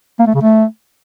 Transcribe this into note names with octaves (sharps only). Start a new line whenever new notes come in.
A#3
A3
C#3
A3